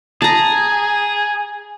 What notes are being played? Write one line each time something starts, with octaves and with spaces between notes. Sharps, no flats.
G#4 A5 A#5